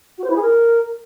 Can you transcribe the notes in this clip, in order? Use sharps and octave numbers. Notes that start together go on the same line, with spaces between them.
F#4
C5
E4
G#4
A#4